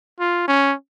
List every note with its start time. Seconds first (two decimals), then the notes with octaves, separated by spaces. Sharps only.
0.20 F4
0.48 C#4